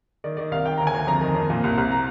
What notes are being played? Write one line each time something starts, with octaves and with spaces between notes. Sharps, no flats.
D#3 D5
D#3 D5
C2 F5
D#3 G5
D2 A#5
G#5
D2
F2 A#5
D#3
F2
A#2
C2
C2
A#5